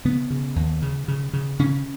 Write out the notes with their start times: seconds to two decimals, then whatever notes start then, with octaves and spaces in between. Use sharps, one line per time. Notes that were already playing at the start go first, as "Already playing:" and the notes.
0.05 C#3 B3
0.30 C#3
0.56 D#2
0.82 C#3
1.08 C#3
1.33 C#3
1.59 C#3 C#4